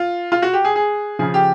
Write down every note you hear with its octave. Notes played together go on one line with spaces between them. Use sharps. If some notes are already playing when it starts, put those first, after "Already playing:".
Already playing: F4
F4
F#4
G4
G#4
G#4
C#3 F3 G#4
G4